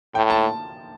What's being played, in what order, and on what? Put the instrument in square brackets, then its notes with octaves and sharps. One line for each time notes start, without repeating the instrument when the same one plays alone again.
[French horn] A2 [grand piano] G5
[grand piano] A5